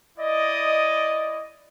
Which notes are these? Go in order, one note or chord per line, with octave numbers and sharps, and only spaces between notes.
E4 D5 D#5